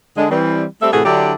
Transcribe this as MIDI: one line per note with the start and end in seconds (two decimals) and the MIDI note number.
0.17 0.28 50
0.17 0.28 56
0.31 0.65 52
0.31 0.65 55
0.31 0.65 60
0.81 0.92 55
0.81 0.92 57
0.81 0.92 60
0.81 0.92 69
0.81 0.92 76
0.92 1.02 45
0.92 1.02 48
0.92 1.02 52
0.92 1.02 66
0.92 1.02 68
0.92 1.02 69
1.05 1.33 50
1.05 1.33 54
1.05 1.33 62
1.05 1.33 64
1.05 1.33 67
1.05 1.33 74